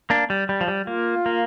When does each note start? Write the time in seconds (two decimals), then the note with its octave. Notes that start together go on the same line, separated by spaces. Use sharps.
0.10 A#3 D4
0.30 G3
0.49 G3
0.61 F3
0.68 G3
0.87 A#3 F4
1.26 A#3